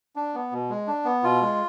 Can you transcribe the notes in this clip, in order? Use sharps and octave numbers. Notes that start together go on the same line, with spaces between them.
D4
B3
B2
G#3
D4
B3
B2 F4
G#3